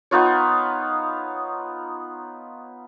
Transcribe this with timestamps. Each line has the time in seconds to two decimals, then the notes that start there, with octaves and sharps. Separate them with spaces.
0.11 B3 D#4 F4 C#5